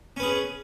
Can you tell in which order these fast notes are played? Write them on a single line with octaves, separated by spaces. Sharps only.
C#4 B4 G#4